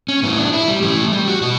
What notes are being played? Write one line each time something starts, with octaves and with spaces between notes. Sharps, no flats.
C#4
A2 E3 B3
D4
E4
G3
A2 E3 A3
G3
F#4
B2 F#4